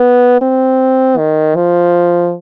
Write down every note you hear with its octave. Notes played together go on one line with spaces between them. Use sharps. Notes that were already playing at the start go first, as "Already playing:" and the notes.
Already playing: B3
C4
D#3
F3